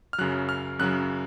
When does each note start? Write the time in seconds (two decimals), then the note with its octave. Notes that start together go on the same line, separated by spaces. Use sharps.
0.13 F6
0.18 F#2 C#3 F#3 F#6
0.49 F6
0.79 F#2 C#3 F#3 F#6